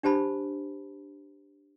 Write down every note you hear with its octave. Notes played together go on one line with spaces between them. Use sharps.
D4 G4 C5 A5 B5